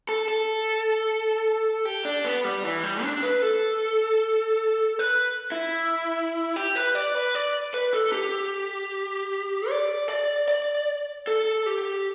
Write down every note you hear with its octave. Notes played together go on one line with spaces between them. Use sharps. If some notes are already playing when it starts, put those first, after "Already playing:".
A4
A4
G4
D4
B3
G3
E3
G3
D4
B4
A4
B4
E4
G4
B4
D5
B4
D5
B4
A4
G4
D5
D5
D5
A4
G4